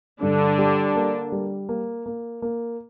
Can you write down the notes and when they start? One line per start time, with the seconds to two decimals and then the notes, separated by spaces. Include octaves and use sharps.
0.21 G2 D3 D4
0.58 G3
0.96 A#3
1.32 G3
1.69 A#3
2.06 A#3
2.42 A#3